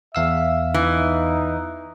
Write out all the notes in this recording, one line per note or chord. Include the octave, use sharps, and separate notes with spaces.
E2 E5 F5 E6
E3 D#4